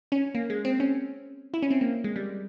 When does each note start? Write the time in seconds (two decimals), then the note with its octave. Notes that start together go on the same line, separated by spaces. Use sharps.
0.12 C#4
0.35 A#3
0.50 G#3
0.65 C4
0.80 C#4
1.54 E4
1.62 C#4
1.71 C4
1.81 A#3
2.04 G#3
2.16 G3